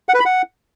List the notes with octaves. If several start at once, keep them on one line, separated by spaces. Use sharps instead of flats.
F#5
B4
B5
F#5